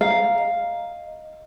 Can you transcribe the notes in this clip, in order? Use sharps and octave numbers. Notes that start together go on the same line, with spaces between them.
F5 A#5
D#5